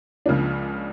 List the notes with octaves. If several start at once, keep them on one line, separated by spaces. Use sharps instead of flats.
C#2 C#3 F3 A#3 D4